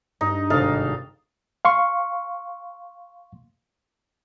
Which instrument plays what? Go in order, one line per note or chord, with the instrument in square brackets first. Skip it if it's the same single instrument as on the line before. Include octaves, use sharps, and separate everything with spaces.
[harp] G2 [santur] D#4
[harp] G#1 C3 [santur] D#4 A4 F5
[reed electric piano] F5 C6 C#6